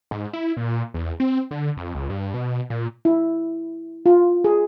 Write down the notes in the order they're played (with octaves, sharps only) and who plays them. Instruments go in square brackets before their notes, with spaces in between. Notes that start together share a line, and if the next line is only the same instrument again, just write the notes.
[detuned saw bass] G#2
E4
A#2
E2
C4
D3
F2
C#2
G2
B2
A#2
[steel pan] E4
F4
G#4